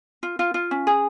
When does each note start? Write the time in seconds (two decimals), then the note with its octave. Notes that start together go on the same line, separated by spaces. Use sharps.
0.23 F4
0.39 F4
0.54 F4
0.71 C#4
0.87 G#4